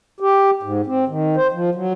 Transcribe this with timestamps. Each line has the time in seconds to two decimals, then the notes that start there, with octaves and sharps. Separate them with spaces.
0.20 G4
0.63 G#2
0.86 C4
1.08 D#3
1.36 C5
1.52 F3
1.75 F#3